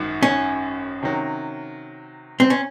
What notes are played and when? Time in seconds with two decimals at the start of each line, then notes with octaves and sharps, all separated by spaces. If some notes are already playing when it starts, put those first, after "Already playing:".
Already playing: G#1 F#2 D#3
0.23 C#4
1.03 C3 D#3 F#3
2.40 C4
2.50 C#4